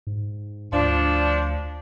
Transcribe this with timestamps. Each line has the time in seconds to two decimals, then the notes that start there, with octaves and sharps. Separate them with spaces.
0.07 G#2
0.73 D2 F3 D4